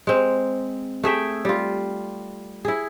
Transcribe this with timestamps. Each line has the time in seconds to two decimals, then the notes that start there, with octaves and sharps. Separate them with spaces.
0.07 G#3 C4
1.03 A3 G#4 E5 G5
1.45 G3 F4
2.65 E4 G#4